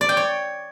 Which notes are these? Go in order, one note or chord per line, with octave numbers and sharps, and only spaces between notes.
D5
G5
C#5